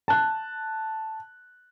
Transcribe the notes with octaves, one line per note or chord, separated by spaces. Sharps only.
A5 F#6